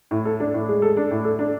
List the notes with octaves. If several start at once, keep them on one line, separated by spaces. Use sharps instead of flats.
A2
A4
D4
A2
G#3
A4
D4
A2
A4
D4